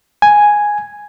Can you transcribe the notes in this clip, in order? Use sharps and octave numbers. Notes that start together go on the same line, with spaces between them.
G#5